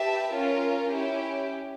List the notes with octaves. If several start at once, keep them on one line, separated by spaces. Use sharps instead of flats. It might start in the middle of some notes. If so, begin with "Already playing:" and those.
Already playing: G4 B4 E5 A5
C#4 F4 A#4
C#4 E4 G4